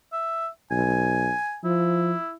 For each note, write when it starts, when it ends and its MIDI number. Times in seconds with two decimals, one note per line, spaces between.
0.13 0.48 76
0.71 1.31 35
0.71 1.59 80
1.64 2.14 53
1.64 2.34 64